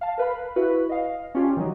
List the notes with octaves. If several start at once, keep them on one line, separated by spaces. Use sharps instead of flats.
F5 A5
A#4 B4 F5 B5
E4 F#4 B4
D#5 F5
C#4 D4 F4 G4
D#3 E3 F#3 D#4